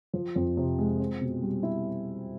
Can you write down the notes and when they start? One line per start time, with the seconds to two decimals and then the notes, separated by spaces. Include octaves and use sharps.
0.13 F3
0.36 F2
0.57 C3
0.78 G#3
0.99 C4
1.21 B2
1.42 G3
1.63 E4